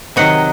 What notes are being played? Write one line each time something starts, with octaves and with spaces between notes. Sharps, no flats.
C3 D#3 F#3 D#5 F#5